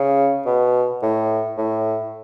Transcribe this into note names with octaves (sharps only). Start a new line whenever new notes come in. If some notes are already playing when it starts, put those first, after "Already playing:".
Already playing: C#3
B2
A2
A2